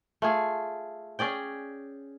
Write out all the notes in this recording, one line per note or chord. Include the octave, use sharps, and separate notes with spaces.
A3 F4 G#4
C#4 G#4 D5 G5